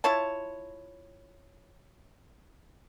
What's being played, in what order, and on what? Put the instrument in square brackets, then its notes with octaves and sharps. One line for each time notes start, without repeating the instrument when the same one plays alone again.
[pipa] E4 F4 C#5 A5